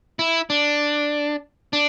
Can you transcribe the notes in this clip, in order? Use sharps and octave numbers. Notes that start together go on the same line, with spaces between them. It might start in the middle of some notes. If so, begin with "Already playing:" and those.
E4
D4
D4